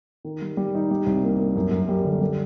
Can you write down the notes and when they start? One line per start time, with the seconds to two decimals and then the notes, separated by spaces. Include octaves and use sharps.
0.25 D#3
0.42 G3
0.57 G3
0.75 D#4
0.91 G3
1.06 C2
1.23 A#3
1.39 A#3
1.56 F#2
1.71 F#2
1.89 G3
2.04 D3
2.21 G3